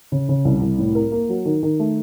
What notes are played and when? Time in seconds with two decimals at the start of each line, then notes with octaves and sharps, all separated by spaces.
0.12 C#3
0.29 C#3
0.45 C2
0.61 C2
0.78 A2
0.95 A#4
1.12 A#3
1.29 F#3
1.45 D#3
1.63 D#3
1.79 A3